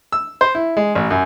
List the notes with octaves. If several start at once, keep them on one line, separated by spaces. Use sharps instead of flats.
E6
C5
E4
G#3
A1
F#2